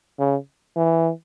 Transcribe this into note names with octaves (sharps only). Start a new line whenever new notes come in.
C#3
E3